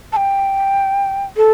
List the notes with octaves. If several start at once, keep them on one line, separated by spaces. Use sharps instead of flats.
A5
G5
A4